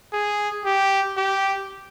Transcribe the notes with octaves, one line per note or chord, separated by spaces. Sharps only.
G#4
G4
G4